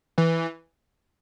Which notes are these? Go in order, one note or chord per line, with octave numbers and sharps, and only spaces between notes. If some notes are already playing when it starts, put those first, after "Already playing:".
E3